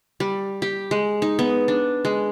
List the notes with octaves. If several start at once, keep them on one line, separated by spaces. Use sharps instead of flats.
G3
G4
G#3
D#4
B3
D4
G#3